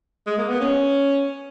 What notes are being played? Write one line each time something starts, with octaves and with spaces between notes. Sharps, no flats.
G#3
A#3
B3
C#4